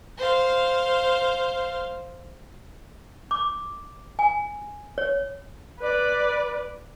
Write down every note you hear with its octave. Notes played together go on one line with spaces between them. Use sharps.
C5 F5
D6
G#5
C#5
B4 D5